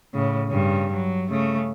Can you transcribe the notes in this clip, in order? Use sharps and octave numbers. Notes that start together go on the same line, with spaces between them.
A2 C#3
G2 C#3
F#3
C#3 A3